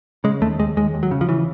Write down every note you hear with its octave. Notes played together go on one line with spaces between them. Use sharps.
C#3 G#3
D#2 A3
D#2 G#3
D#2 G#3
D#2
F#3
C#3
F3
C#3 E3